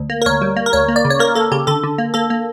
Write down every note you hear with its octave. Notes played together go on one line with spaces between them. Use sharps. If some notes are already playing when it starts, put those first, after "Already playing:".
Already playing: D2
A#3
A#4
D2 C#5
G3
A#3
A#4
D2 C#5
A#3
D5
C#3
C#5
A#3 A#4
A#3 A4
C#3 G4
D3 A4
D3
A#3
A#3 A4
A#3